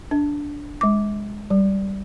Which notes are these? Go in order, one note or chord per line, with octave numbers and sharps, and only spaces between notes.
D4
G#3 D6
G3